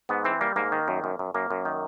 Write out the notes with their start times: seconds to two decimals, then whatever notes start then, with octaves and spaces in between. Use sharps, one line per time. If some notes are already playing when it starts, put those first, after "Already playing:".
0.09 G#2 B3
0.25 E3 C4
0.41 G3 A#3
0.56 G#2 A#3
0.72 D#3
0.88 F#2
1.04 F#2
1.19 F#2
1.34 F#2 A#3
1.51 F#2
1.65 D#3